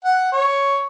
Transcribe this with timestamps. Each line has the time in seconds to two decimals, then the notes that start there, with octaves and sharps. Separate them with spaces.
0.04 F#5
0.32 C#5